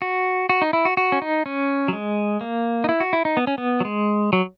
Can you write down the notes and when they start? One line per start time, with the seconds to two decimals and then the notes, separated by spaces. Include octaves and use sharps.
0.02 F#4
0.49 F#4
0.62 D#4
0.73 E4
0.85 F#4
0.97 F#4
1.12 C#4
1.22 D#4
1.46 C#4
1.88 F#3
1.93 G#3
2.41 A#3
2.84 D#4
2.89 E4
3.00 F#4
3.13 E4
3.25 D#4
3.37 B3
3.47 C#4
3.58 B3
3.80 F#3
3.85 G#3
4.33 F#3